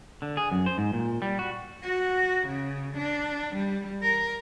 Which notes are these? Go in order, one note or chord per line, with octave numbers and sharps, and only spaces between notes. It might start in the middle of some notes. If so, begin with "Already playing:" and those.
D3
G#4
F#2
C5
G#2
A#2
G3
F#4
F#4
C#3
D4
G3
A#4